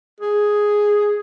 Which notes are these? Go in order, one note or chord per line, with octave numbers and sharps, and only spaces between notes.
G#4